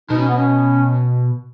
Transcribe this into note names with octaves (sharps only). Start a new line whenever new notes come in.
B2 D#4
C#4
B3
C#4